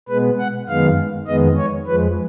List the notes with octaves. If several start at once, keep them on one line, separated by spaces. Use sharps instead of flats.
B2 G#3 B3 B4
F#5
F#2 D#3 G#3 B3 F5
F2 D#3 G#3 B3 D#5
C#5
F2 F3 G#3 B4